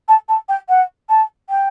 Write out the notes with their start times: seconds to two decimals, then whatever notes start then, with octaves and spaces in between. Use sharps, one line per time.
0.08 A5
0.29 A5
0.49 G5
0.69 F#5
1.09 A5
1.50 G5